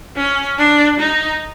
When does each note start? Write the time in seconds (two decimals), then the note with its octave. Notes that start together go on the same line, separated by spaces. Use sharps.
0.16 C#4
0.58 D4
1.00 D#4